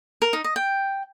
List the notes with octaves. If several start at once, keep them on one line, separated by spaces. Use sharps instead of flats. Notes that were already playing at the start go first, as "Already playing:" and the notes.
A#4
D#4
D#5
G5